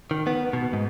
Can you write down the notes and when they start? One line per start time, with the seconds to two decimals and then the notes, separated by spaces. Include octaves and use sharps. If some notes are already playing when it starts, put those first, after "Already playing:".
0.11 D#3
0.27 B3
0.53 B2
0.73 G#2